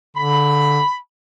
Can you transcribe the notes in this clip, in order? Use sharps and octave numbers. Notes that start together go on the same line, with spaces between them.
D3 B5